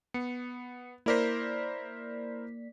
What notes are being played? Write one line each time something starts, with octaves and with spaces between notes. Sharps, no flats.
B3 C#7
A#3 E4 A#4 C5 D5 B6